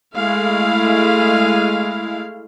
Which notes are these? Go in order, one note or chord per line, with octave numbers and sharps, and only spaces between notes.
G#3 A3 E4 F5